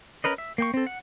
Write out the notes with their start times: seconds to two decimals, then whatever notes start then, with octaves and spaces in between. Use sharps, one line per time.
0.24 C#4 A#4 B4 D#5
0.38 E5
0.58 A#3 G5 C#6
0.74 C4 A4
0.87 F#5